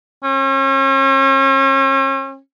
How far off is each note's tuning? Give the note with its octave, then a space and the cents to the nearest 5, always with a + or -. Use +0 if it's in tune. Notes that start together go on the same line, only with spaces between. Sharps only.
C#4 -40